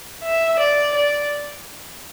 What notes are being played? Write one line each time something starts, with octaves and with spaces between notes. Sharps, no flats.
E5
D5
D5